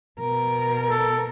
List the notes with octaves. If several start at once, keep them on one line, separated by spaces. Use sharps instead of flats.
B2 A#4
A4